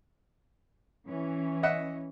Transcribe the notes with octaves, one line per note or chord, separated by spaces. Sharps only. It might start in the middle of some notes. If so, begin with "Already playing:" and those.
E3 C#4
D#5 E5 F#5